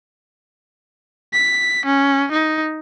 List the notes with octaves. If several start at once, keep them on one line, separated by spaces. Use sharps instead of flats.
B6
C#4
D#4